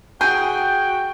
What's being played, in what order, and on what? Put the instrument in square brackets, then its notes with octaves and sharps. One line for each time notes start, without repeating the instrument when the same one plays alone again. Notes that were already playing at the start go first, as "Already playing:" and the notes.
[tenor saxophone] F#4 [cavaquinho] G#4 [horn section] G5 [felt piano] G6